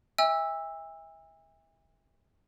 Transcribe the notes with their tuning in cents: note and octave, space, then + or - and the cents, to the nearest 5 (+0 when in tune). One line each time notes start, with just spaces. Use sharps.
E5 -30 G#5 -45 E6 +0